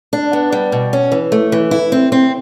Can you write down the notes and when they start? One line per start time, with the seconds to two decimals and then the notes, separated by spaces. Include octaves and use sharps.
0.13 D4
0.33 B3
0.52 G3
0.72 B2
0.93 C#4
1.12 E3
1.32 A3
1.52 E3
1.71 E4
1.92 C4
2.12 C4